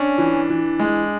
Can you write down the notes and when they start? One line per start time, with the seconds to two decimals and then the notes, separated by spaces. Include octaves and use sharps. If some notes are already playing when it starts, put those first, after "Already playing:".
Already playing: C#4 D4
0.18 E3
0.49 E3
0.79 G#3